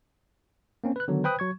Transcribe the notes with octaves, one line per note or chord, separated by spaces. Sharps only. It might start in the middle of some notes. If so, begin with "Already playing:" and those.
A#3 C4 C#4
B4 F#6
D3 D#3 F#3 B3
B4 C5 G5 B5 D#6 F#6
F#3 C#6 G#6